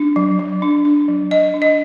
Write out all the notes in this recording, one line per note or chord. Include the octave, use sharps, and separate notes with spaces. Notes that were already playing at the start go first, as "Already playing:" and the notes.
Already playing: D4
F#3
F#3
D4
D4
F#3
F#3 D#5
D4
D#5